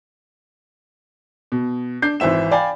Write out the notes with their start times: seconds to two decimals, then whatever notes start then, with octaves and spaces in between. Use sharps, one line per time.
1.52 B2
2.02 D4 G6 C7
2.20 G#1 E3 C5 E5 E7
2.51 D5 F5 G5 G#5 B5